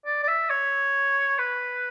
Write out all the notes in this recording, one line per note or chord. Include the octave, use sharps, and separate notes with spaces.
D5
D5
E5
C#5
B4